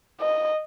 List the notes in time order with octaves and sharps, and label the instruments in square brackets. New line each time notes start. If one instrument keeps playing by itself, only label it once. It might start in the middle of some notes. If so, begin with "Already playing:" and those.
[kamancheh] D#5